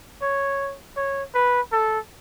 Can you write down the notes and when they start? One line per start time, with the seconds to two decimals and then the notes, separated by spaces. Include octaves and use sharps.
0.22 C#5
0.97 C#5
1.34 B4
1.73 A4